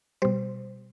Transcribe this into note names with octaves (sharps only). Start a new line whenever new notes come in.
B2 G3 C5